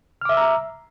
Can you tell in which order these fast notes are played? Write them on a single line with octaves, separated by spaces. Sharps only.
F6 D6 E5 E6 A#5